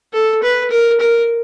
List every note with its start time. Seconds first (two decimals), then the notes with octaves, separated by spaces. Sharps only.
0.13 A4
0.43 B4
0.71 A#4
1.00 A#4